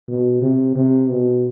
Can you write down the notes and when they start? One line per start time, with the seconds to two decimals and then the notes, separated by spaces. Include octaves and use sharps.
0.08 B2
0.42 C3
0.75 C3
1.10 B2